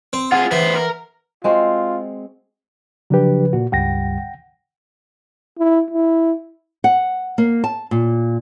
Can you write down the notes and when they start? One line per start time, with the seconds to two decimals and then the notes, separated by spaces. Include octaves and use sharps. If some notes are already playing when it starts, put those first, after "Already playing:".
0.13 C4
0.32 F4 G#4 F#5
0.51 E3 B3 C5
0.76 A#4
1.44 G#3 C4 F4 F#4
3.10 C#3 F3 F#3 D4 G4 B4
3.53 A#2 F#4
3.72 C#2 G2 G3 F#5 G5 A#6
5.58 E4
5.91 E4
6.84 F#5
7.38 A#3
7.64 A5
7.91 A#2